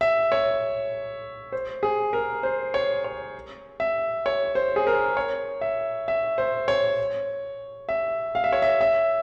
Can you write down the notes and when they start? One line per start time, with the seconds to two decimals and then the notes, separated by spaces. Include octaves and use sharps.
0.01 E5
0.32 C#5
1.52 C5
1.83 G#4
2.13 A#4
2.43 C5
2.74 C#5
3.04 C#5
3.80 E5
4.26 C#5
4.55 C5
4.76 G#4
4.87 A#4
5.17 C#5
5.61 E5
6.08 E5
6.38 C5
6.68 C#5
7.89 E5
8.35 F5
8.44 E5
8.53 C#5
8.62 E5
8.81 E5